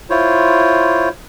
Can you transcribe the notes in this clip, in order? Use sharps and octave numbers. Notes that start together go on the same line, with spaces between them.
E4 F4 C5 C#5